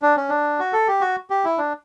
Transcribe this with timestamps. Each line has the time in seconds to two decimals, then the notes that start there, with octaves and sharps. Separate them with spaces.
0.02 D4
0.17 C#4
0.29 D4
0.59 F#4
0.73 A4
0.88 G4
1.01 F#4
1.30 G4
1.45 E4
1.58 D4